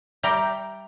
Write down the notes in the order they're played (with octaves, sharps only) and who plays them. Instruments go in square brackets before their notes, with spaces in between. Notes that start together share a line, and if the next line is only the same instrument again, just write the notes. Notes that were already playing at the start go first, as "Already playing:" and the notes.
[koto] G3 G5 [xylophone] E5 A#5 A#6